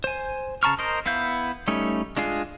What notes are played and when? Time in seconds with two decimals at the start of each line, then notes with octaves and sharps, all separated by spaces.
0.04 C5 G#5
0.63 C#3 A5 A#5 C#6 F6
0.79 A#4 C5 D#5
1.06 B3 E4 F5 G6
1.68 G3 A3 C#4 D#4
2.17 G#3 D4 F4 G#4